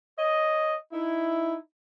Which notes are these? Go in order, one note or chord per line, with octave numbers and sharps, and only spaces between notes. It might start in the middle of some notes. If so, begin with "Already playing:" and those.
C#5 D#5
D#4 E4